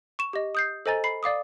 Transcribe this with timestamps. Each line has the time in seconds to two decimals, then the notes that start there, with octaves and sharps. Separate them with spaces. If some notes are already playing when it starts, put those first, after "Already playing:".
0.19 C#6 E7
0.33 G4 D#5
0.55 D#6 G6 C7
0.86 A4 C5 D#5 G#5 A#5 A6
1.04 B5 C7
1.23 D5 F5 D6 D#6